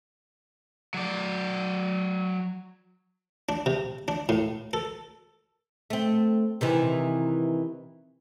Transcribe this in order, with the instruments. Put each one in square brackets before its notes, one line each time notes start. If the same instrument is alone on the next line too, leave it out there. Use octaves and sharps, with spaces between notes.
[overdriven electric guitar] F#3 D5
[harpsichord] D4
C3
D4
A2
A4
[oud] A3 C4
C3 D#3 E3